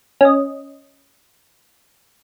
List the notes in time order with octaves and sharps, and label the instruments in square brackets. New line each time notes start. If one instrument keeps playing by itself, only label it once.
[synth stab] C#4 D#5